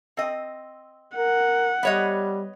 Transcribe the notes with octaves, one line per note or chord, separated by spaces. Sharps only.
C4 D#5
A#4 F#5
G3 B3 C#5 D#5